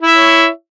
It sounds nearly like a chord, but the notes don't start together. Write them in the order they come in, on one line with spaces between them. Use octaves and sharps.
E4 E5 C#5